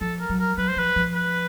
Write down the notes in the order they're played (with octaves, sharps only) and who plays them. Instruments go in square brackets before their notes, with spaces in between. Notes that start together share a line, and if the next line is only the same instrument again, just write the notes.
[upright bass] F3 [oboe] A4
[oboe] A#4
[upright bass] F#3
[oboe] A#4
[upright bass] F#3 [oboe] B4
[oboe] C5
[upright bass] F3 [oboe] B4
[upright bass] F3
[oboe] B4